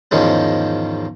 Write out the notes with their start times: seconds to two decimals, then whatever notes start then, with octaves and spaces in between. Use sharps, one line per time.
0.11 E2 G#2 D#3 F3 G#3 C#4